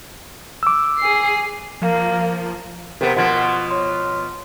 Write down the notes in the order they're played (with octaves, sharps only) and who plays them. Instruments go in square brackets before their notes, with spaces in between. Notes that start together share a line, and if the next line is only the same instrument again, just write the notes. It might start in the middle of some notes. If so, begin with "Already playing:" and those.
[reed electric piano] D6 E6
[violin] G#4 C7
[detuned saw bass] F3 [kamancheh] A#3
[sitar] C3 B3 [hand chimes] A#4 C5
[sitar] B2 F3 [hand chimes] F#5 C6 G#6
[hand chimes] C#5 C6